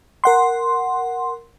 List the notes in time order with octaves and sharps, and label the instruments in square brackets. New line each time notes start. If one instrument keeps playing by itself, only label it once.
[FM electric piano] A#4 F#5 C6